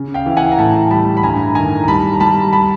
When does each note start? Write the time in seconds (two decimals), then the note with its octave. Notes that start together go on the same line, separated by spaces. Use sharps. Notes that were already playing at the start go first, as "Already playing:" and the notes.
Already playing: C#3
0.14 F5 G5
0.26 E3
0.37 F#5 G#5
0.52 A#5
0.59 A2 G5 A5
0.91 G3 A5 B5
1.17 B5
1.23 G2 G#5 A#5
1.55 D#3 G#5 A#5
1.84 A#5
1.88 G3 A5 B5
2.13 A#5
2.20 G3 A5 B5
2.53 A5 B5